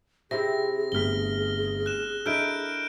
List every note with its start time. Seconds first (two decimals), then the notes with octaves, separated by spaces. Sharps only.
0.31 C3 C4 E4 G#4 A#6
0.92 G1 A3 F6 B6 G7
1.86 F#6 E7
2.26 D4 E4 A4 A#4 D#5 F6 G6 D7